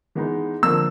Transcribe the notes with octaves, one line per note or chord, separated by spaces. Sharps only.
E3 G#3 B3 D#4
D3 F3 A#3 E6